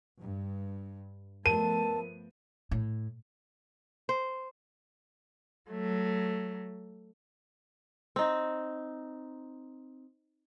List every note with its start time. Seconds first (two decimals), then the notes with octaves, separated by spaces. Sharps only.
0.19 G2
1.46 F3 A3 B3 A#4 A5 D#7
2.71 A2
4.09 C5
5.70 F#3 A3
8.16 C4 D#4